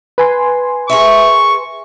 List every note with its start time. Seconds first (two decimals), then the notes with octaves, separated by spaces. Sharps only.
0.18 B4 G#5 C6
0.90 G#4 A#4 E5 C#6